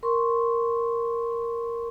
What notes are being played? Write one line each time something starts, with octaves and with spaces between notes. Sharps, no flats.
A#4 C6 C#6